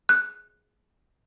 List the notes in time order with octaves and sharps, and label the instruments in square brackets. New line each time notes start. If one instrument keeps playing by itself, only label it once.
[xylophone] F#6